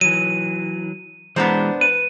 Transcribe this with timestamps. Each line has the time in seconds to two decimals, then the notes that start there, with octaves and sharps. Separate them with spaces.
0.01 E3 F#3 D#7
1.36 E3 G#3 B3 D4 C5 A#5
1.81 B4 D#7